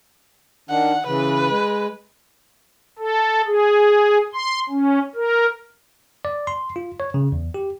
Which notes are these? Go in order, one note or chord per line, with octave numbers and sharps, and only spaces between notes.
D#3 D4 F#5
C#3 E3 B4
G#3
A4
G#4
C6
C#4
A#4
D5
C6
F4
C#5
C#3
E2
G4